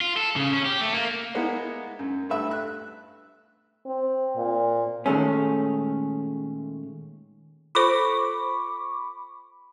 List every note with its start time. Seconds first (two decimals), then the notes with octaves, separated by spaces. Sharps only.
0.01 F4
0.17 A4
0.36 C#3
0.53 C#4
0.66 G4
0.81 A3
0.94 A#3
1.35 G#3 A#3 B3 D#4 E4
1.99 F#2
2.29 G2 A3 B4 E5 E6
2.51 F#6
3.86 C4
4.36 A#2
5.06 A#2 D#3 G#3 A3 C#4
7.75 F4 A4 C5 B5 C#6 D6